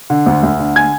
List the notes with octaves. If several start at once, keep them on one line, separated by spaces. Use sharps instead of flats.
D3
D2
D2
D3
G#5 G#6